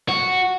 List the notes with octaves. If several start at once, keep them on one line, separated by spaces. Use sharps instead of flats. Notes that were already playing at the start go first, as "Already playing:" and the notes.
F#4